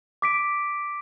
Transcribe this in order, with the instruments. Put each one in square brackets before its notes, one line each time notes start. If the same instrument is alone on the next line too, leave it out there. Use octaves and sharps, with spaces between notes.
[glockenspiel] D6 B6 D7